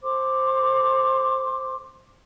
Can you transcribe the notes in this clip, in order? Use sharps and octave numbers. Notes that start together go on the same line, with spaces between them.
A4 C5 C6 D6